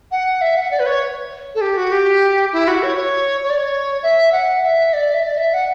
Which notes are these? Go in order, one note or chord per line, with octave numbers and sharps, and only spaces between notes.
F#5
E5
F#5
D5
B4
C#5
A4
G4
F#4
G4
E4
F#4
C#5
C#5
C#5
D5
C#5
E5
F#5
E5
D5
E5
D5
E5
F#5